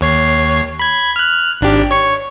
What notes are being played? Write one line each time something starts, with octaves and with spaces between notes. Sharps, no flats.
D#2 C#5 C7
B5 G#6
F6 F#6
G#1 D4 G4
C#5 C#6